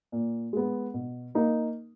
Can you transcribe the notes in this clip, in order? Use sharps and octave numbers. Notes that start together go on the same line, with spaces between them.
A#2
G#3 B3
B2
A#3 D#4 A#4